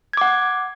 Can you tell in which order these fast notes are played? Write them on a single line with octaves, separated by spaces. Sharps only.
G#6 D6 F#5